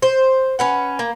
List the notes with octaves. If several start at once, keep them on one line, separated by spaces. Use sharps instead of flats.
C5
C#4 B4 F#5
A#3